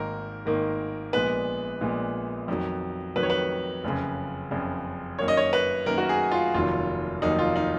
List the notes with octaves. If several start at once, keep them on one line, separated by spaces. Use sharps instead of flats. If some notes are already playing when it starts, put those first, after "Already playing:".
Already playing: G#1 G#2 D#3 A#3 A#4
G#1 G#2 D#3 A#3
A#1 A#2 G#3 B3 B4
A#1 A#2 G#3 B3
F2 D#3 F#3
F2 D#3 F#3 B4
C#5
B4
F#1 F2 C#3
F#1 F2 C#3
F#2 D#3 A#3 C#5
D#5
C#5
B4
F#2 D#3 A#3 A#4
F#4
G#4
F4
F1 D#2 D#3 F#3 F4
F1 D#2 D#3 F#3 D#4
F4
D#4